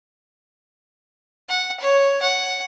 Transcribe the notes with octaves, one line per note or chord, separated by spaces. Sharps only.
F#5
C#5
F#5